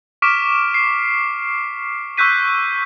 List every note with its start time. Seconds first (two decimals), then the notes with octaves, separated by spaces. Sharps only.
0.22 C#6 D6 F6 B6 D7 E7
0.74 C7
2.17 C#6 E6 F#6 G6 B6 D#7